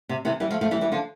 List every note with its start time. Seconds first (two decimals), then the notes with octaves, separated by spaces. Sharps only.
0.09 C3
0.25 C3 E3
0.40 E3 G3
0.51 F3 A3
0.61 F3 A3
0.71 E3 G3
0.81 E3 G3
0.92 D3 F3